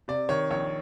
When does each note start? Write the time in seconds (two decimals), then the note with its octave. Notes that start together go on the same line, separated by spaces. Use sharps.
0.08 C3 D5
0.29 D#3 C#5
0.51 A#1 C#5